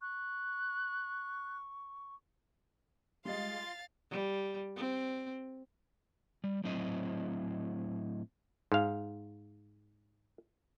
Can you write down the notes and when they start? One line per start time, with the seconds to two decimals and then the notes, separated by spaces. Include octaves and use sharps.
0.01 C#6 F#6
3.25 G3 G#3 F4 D#5 F5 C6 A6
4.11 G3
4.76 C4
6.44 G3
6.64 A2 F#3 C4 E4 C5 D#5
8.72 G#2 F5